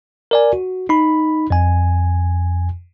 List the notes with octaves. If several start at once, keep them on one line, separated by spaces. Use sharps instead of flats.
A#4 D5 G#5
F#4
D#4 B5
F2 G#5